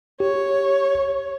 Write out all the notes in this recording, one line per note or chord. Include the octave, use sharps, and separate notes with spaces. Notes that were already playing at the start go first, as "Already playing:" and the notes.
G4 C#5